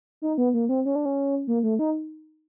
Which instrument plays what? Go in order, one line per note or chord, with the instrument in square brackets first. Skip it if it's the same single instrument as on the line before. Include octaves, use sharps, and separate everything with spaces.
[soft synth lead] D#4
B3
A#3
C4
C#4
D4
C#4
A#3
A3
D#4